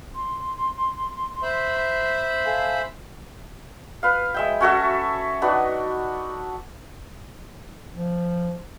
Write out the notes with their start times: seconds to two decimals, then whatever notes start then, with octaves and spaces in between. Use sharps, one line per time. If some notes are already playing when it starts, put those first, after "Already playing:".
0.14 C6
1.42 C5 E5 B5
2.45 A4 F5 G#5
4.03 B4 F5
4.34 G#3 E5 G5
4.60 C#4 F#4 A4 E5
5.42 D4 D#4 F#4 B4
7.94 F3